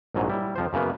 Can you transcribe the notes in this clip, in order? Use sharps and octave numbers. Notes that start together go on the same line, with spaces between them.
A#1 G#2 F#3
G3 E4
F2 F3 C5
F#2 C#3 A#3 B3